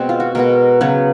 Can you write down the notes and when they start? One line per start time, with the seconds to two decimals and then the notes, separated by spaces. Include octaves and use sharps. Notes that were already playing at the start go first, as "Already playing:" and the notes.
Already playing: B2 G#3 B3 C4
0.09 F4
0.20 F#4
0.35 B2 G#3 B3 A#4
0.81 C#3 F#3 B3 B4